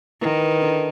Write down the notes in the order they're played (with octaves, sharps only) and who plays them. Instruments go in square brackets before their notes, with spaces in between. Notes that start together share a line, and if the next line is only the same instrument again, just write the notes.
[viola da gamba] D#3 [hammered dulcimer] E3
[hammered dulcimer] D3